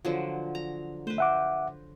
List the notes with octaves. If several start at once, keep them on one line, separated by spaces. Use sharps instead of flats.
D3 F3 F#3
A#5
A3 B4 C5
E5 F#5 D6